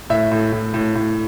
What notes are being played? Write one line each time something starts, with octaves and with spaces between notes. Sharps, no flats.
A2 E5
A2
A2
A2
A2